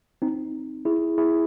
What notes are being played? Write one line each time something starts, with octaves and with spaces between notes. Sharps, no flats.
C4 D#4
E4 G#4
E4 G#4